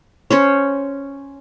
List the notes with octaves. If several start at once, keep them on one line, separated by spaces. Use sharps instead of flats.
C#4 C5 C#5